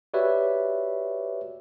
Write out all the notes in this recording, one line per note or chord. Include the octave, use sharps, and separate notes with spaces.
F#4 G4 B4 C#5 D5 E5